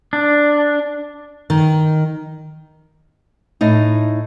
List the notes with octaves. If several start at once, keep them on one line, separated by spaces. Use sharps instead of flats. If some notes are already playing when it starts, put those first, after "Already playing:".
D4
D#3
A2 D#4